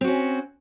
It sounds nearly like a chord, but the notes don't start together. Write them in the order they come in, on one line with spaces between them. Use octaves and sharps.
C4 F#4 C#4